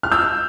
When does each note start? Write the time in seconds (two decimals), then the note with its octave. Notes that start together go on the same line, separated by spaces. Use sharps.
0.03 F6
0.12 E6 G6